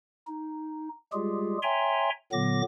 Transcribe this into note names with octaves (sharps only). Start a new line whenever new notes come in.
D#4
G3 G#3 F4 G4 G#4
C#5 E5 G5 G#5 A#5 C6
A#2 D3 F#3 B3 D6 A#6